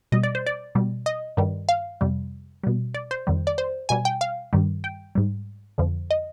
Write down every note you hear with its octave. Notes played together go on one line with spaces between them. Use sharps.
B2 G3 D#5
D5
C5
D5
B2 G3
D#5
G2 D#3 G3
F5
F2 C3 G3
B2 G3
D5
C5
F2 D#3 G3
D5
C5
B2 G3 G#5
G5
F5
G2 D#3 G3
G5
G#2 G3
F2 D3 F3
D#5